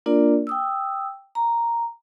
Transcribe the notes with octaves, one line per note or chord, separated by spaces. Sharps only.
A#3 D4 F4 A#4 D5
G5 D#6 E6
A#5